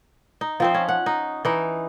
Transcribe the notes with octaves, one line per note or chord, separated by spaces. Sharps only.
D#4
F3 C4 C5
C#4
F#5
D#4
E3 D#4